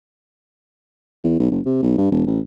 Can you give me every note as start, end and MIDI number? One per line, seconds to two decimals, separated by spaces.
1.24 1.37 40
1.40 1.49 35
1.51 1.61 30
1.65 1.80 48
1.82 1.97 35
1.98 2.07 43
2.12 2.23 28
2.27 2.40 33